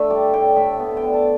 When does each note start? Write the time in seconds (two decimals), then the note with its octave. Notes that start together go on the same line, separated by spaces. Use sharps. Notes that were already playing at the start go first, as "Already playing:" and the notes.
Already playing: D3 A3 E5
0.10 G3 D5
0.34 A2 G5
0.56 A2 E5
0.79 B3
0.97 G5
1.02 D3
1.14 A5